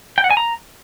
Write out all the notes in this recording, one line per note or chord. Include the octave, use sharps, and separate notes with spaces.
G5
F#5
G#5
A#5